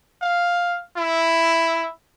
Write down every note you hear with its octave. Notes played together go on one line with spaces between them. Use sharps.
F5
E4